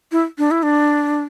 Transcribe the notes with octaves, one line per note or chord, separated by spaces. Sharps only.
E4
D4
E4
D4